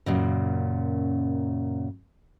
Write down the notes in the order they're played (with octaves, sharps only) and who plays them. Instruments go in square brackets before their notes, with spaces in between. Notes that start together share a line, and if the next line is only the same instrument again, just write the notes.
[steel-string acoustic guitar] F#2 A#2 C#3